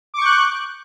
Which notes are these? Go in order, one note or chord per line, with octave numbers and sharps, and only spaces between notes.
C#6 D6 F#6 G6